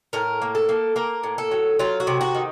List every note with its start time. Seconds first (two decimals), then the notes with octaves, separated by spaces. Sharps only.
0.13 A2 A#4
0.42 A#3
0.55 A4
0.69 A#3
0.96 A#3 A#4
1.24 A2
1.38 A4
1.51 F#3
1.79 F#3 F4
2.00 F#4
2.07 C3
2.21 F#4
2.35 D#3